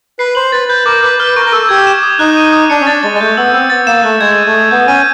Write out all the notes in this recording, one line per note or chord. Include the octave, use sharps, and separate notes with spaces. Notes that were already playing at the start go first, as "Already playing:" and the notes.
B4 C7
C5 F#7
B4 A6
B4 G6
A#4 D6
B4 D6
B4 F6
A#4 C#6
A#4
A4 C#6
G4 G#6
E7
D#6
D#4 F#6
D#7
D#6
D4 C#7
C#4
D4 A6
G#3 A6
G#3
A3 G6
B3 E6
C4 E6
B3 A6
A#3 E7
A3 F#6
G#3 G#6
D#7
A3
D#6
B3 G6
C#4 D#7